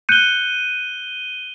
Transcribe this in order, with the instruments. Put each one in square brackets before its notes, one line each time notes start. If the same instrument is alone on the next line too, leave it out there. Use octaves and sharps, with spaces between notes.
[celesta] F#6 G6 C#7 [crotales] D#7 G7